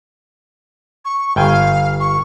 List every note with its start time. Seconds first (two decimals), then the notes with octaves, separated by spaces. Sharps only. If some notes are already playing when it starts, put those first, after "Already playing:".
1.05 C#6
1.36 G1 F5 G5 G#5
2.00 C#6